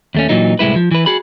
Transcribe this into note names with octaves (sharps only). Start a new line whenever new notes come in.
D#2 A3 C#4
A#2 E3 F#3 D#4
C2 A2 G#3 E4 B4
F3
E3 B4
F#4 G#4 B5